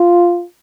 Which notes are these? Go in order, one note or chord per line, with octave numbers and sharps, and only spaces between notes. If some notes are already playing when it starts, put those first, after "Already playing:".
Already playing: F4